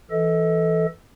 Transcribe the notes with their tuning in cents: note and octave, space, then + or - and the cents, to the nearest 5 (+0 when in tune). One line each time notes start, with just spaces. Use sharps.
E3 +10 A4 +0 D#5 +35